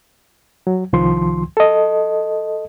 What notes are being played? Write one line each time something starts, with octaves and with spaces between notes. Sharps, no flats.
F#3
C2 D#3 F3 C6
A4 D#5